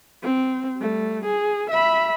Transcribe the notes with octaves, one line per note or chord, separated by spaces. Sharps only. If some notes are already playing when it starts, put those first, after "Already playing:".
C4
G3 A3
G#4
E5 B5